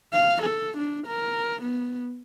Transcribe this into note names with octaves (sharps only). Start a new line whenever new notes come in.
F5
A4
D4
A#4
B3